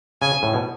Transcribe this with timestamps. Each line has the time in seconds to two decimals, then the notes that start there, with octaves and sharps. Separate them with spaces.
0.21 C#3 G#5
0.43 A2
0.53 B2